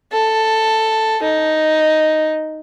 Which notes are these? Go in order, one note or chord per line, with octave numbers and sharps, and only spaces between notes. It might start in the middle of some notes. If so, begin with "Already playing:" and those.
A4
D#4